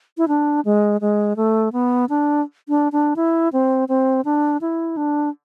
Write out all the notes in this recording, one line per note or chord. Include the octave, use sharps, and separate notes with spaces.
E4
D4
G#3
G#3
A3
B3
D4
D4
D4
E4
C4
C4
D4
E4
D4